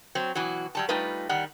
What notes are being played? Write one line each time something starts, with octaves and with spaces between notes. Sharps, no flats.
F#3 C4
B2 E3 F#3 F#4
F#3 G3 A5
G3 A3 D#4 F4 B4
D#3 G3 F#5